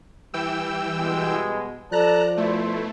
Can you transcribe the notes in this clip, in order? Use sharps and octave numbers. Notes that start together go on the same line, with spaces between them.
E3 G3 G5 E6
B2 G#3
F3 A4 D5 A5 A#5 F#6
B2 A3 E4 C5